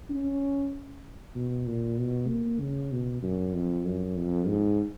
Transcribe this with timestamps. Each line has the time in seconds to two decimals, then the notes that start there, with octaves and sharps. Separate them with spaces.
0.10 C#4
1.35 B2
1.66 A#2
1.98 B2
2.29 A#3
2.60 C#3
2.92 B2
3.23 F#2
3.54 F2
3.85 F#2
4.17 F2
4.48 G#2